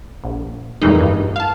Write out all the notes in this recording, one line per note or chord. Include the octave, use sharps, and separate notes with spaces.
A#1
F2 A#2 E3 G3 G#3 D#4
G2
F5 A5